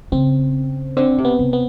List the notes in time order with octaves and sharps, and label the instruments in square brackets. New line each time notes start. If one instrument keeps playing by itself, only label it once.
[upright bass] C#3 [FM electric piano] C4
[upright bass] D3 [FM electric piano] C4
[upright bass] C3
[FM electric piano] B3
[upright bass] C3
[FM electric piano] B3